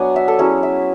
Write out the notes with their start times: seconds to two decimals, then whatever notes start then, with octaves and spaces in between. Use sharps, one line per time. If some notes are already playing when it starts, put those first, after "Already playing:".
Already playing: F#3 B3 D4 F#5 G#5
0.16 E5
0.28 A4
0.39 F#3 C#4 E4 G#4
0.63 E5